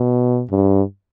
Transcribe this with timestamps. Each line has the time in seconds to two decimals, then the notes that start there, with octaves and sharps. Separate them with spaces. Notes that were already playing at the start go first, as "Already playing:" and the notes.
Already playing: B2
0.51 G2